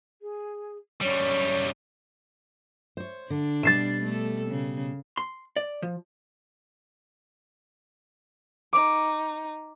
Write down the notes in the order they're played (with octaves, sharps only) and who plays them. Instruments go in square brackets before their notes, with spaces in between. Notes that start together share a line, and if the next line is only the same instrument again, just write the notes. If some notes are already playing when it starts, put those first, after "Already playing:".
[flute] G#4
[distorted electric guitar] F#2 G3 [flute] C#5
[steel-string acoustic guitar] C5 C#5
[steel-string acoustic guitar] D3 [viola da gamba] D4
[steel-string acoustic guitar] B2 G3 [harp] A6 C7 E7
[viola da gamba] A3 A4
C#3
[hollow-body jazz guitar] C6
D5
F3
[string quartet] D#4 [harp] D6